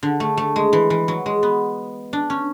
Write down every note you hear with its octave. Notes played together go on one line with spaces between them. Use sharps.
D3
A3
A3
G#3
E3
E3
F#3
G#3
B3
D4
C#4